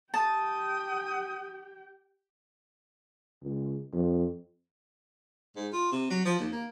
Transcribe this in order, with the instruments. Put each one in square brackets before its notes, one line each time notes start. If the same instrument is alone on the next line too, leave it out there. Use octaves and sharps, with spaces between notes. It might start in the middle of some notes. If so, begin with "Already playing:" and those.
[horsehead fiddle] G4 G5 [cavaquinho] A5 [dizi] D#6
[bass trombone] C#2
F2
[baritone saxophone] G#2
F4
C3
F#3
F3
D#2
A#3